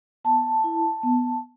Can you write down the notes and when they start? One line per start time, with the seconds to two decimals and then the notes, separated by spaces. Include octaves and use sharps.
0.25 B3 A5
0.64 E4
1.03 B3